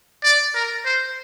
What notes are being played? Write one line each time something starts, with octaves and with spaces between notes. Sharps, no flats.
D5
A#4
C5